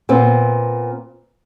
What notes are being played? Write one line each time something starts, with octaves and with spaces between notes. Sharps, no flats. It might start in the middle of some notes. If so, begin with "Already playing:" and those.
A#2 B3 C4